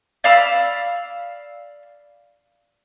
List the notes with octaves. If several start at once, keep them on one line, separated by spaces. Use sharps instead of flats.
D5 F5 B5 E6